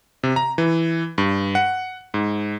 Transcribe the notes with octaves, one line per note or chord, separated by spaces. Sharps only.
C3
A#5
E3
G2
F#5
G#2